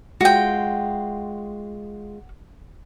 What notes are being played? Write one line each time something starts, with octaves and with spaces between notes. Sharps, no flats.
G#3 F4 F#4 G5